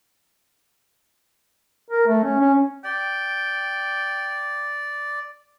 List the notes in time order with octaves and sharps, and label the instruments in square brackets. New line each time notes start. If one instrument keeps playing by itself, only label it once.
[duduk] A#4
A3
C#4
C#4
[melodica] D5 [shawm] G5